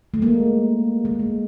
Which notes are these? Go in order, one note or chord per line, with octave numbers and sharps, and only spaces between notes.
A3
G#3 A#3
G#3
A3